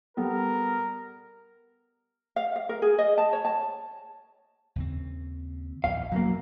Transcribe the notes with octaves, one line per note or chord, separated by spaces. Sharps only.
G3 B3 A4 A#4
F5
F5
A#4
G#4
D#5
A5
C#5
A5
D#2 C#3 C4
A#1 E2 F5
F#2 B2 E3 F#3 A#3